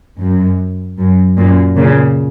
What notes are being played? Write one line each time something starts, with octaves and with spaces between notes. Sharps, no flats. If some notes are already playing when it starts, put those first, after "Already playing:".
F#2
F#2
F#2 A#2
A#2 C#3